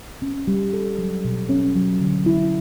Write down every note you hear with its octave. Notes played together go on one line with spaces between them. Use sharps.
C#4
G3
A4
F#3
B2
C#4
F#3
D3
E4